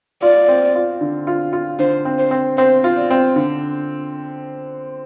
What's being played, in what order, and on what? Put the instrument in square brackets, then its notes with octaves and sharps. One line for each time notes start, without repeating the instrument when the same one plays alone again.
[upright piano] F4 [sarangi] D5
[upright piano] C4
F4
D3
F4
F4
[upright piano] D3 [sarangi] C5
[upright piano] C4
[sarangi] C5
[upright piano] C4
[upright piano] C4 [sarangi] C5
[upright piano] F4
[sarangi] D5
[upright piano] C4
D3